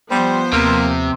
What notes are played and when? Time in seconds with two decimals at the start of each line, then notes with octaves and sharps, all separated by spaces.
0.11 F3 G3 B3 C5
0.53 D#2 C3 A#3